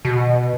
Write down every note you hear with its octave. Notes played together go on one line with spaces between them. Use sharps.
B2